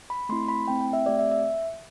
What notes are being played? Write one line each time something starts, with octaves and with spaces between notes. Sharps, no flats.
B5
A3 C4 E4 C6
B5
A3 C4 E4 G5
G5
E5
A3 C4 G4 D5
E5
E5